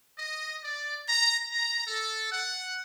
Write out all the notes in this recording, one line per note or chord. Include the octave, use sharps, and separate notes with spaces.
D#5
D5
A#5
A#5
A4
F#5